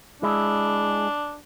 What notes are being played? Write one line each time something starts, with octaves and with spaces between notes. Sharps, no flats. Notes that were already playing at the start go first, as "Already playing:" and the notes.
G#3 D4 E4